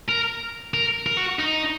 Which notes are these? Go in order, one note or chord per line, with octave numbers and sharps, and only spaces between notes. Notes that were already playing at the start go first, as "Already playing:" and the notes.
A#4
A#4
A#4
F#4
D#4